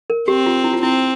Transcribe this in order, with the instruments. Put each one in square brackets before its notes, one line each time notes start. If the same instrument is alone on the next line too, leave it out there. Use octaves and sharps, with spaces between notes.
[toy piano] A#4
[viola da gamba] C4 [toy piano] G4
[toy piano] F4
E4
F4
[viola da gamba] C4 [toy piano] E4